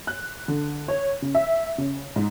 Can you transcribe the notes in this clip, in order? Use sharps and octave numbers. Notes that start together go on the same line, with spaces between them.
F#6
D3
C#5
C#3
E5
C#3
G#2